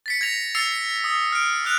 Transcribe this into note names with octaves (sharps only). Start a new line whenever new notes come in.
A6 B6 C#7
G#6 A#6 F7
E6 A6 C7 C#7 F7
D#6
F6 D7
D#6 F6 F#6 F7